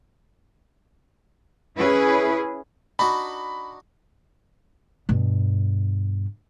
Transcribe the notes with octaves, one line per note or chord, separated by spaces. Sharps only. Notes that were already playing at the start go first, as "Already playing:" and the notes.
C#4 E4 G#4 B4
D4 D#4 F#4 B5
G2 B2